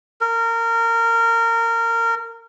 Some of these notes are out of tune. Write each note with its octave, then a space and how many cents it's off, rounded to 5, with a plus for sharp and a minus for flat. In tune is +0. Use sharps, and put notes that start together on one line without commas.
A#4 -20